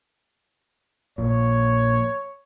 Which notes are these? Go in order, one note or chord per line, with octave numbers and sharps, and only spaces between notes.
A#1 A#2 C#5